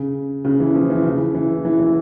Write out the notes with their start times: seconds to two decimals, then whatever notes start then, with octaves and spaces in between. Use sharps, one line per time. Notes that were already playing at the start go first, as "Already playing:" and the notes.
Already playing: C#3
0.45 C#3
0.60 E3
0.75 F3
0.90 E3
1.04 C#3
1.34 E3
1.65 E3
1.80 E3